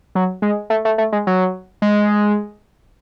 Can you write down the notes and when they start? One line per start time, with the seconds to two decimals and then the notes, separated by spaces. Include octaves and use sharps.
0.15 F#3
0.42 G#3
0.70 A3
0.85 A3
0.98 A3
1.12 G#3
1.27 F#3
1.82 G#3